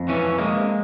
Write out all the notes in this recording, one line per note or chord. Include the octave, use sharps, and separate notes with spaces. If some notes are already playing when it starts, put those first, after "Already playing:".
Already playing: F2
E3 C#4
G#3 A#3